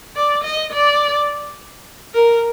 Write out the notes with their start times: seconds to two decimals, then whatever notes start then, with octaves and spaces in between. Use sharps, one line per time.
0.16 D5
0.44 D#5
0.73 D5
2.14 A#4